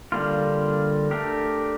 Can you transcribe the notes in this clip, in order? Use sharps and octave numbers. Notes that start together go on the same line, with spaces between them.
D3 G3 A#3 D4 F4
A3 D4 G4 A#4